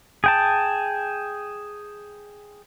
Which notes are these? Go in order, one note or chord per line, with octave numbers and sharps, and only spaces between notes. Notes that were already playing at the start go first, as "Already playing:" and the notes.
G#4 G5 A5